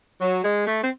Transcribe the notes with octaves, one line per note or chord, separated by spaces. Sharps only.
F#3
G#3
A3
C4